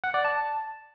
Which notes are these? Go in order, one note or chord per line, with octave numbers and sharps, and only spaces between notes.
F#5
D5
A5